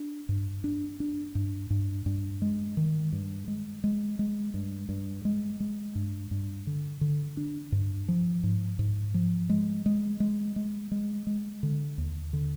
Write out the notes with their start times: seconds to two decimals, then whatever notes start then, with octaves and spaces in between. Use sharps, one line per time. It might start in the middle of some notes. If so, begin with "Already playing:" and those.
Already playing: D4
0.29 G2
0.64 D4
1.00 D4
1.35 G2
1.70 G2
2.06 G2
2.42 G#3
2.77 D#3
3.12 G2
3.48 G#3
3.84 G#3
4.19 G#3
4.54 G2
4.89 G2
5.25 G#3
5.60 G#3
5.95 G2
6.31 G2
6.67 D3
7.01 D3
7.37 D4
7.72 G2
8.08 F3
8.43 G#2
8.79 G#2
9.14 F3
9.50 G#3
9.86 G#3
10.20 G#3
10.56 G#3
10.91 G#3
11.27 G#3
11.63 D3
11.98 D#2
12.33 D3